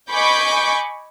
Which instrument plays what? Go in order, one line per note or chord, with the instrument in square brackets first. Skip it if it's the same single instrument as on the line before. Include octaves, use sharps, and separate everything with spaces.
[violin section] D#5 G#5 B5 C#6 D6 G6